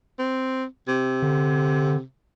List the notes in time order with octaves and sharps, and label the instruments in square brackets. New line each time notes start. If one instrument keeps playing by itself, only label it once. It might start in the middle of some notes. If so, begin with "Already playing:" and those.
[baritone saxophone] C4
C3
[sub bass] D3